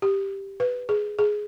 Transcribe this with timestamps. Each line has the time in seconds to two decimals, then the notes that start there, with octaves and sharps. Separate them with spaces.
0.02 G4
0.60 B4
0.89 G#4
1.19 G#4